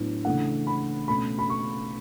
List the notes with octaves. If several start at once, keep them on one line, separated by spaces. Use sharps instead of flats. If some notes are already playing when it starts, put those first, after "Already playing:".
Already playing: A2 F#3 B3 D4
C#3 E3 A3 D4 F#5
B5
B2 A3 C#4 B5
B5
C#6